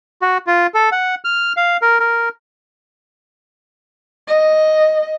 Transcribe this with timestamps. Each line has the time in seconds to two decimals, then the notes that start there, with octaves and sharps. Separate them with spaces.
0.22 F#4
0.47 F4
0.74 A4
0.92 F#5
1.25 F6
1.57 F5
1.82 A#4
2.00 A#4
4.27 D#5